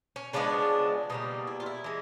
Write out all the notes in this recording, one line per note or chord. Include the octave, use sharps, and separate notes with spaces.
C#4
C#3 F3 G#3 B3 D4
B2 G3 A#3 D#4
E4
F4
E4
E3 G#3